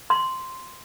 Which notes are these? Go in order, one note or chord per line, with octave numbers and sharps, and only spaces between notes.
C6